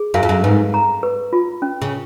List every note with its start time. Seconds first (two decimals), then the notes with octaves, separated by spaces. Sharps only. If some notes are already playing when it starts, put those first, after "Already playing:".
Already playing: G#4
0.14 F#2 F5
0.23 F2
0.29 F#2
0.44 G#2 B4
0.74 A#5
1.03 B4
1.33 F4
1.62 C#4
1.82 C#3